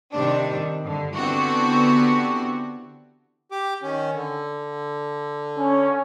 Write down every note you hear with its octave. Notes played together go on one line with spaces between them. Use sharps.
C3 D#3 G3 D4
G2 D3
D3 E3 B3 C4 F#4 G4
G4 D6
D#3 C#4
D3
C#4